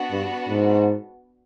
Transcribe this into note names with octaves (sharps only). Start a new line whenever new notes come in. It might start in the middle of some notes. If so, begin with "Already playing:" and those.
Already playing: B3 D4 F#4
G2
G#2